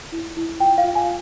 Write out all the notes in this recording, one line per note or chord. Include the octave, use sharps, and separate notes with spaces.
E4
E4
F4 G5
F5
F4
G#5